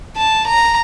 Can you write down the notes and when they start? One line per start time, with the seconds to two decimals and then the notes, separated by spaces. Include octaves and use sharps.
0.17 A5
0.46 A#5